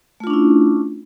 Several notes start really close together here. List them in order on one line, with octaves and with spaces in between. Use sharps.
A3 F4 D4 C#4 E4